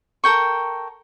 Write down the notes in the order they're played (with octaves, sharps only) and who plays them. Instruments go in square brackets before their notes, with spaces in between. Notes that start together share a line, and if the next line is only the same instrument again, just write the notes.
[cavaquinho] A4 A#4 G5 C#6